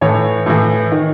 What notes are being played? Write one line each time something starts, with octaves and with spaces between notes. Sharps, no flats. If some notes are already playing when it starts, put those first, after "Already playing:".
A2 E3 C#5
A2 E3
D#3